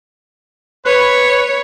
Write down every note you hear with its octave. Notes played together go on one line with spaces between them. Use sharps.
B4 C#5